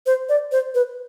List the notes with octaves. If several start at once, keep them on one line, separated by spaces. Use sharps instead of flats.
C5
D5
C5
B4